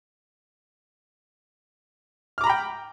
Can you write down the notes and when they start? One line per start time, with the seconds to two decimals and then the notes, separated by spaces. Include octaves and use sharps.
2.38 F6
2.41 D6
2.44 A#5
2.47 B5
2.49 G5